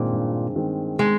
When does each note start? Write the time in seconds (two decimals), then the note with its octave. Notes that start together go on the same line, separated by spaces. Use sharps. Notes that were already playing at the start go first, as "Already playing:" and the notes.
Already playing: G2 A#2 D#3 G#3 C4
0.12 G2
0.56 D#3 G#3 C4
0.99 G#3